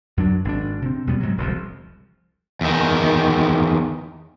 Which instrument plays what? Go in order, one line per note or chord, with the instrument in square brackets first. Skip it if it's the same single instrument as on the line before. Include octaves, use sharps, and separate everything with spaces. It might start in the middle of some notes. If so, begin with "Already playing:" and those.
[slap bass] F#2 F#3 D4
G#1 C4 D4
C3 C4
E2 B2 G3 B3
G#2 C3 F#3
E1 C2 F3
[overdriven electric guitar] E2 D#3